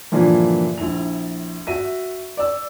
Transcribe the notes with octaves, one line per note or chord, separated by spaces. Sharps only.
G2 A#2 D3 E3 F3
A#1 E4 F7
F#4 E5 D#7
D5 E6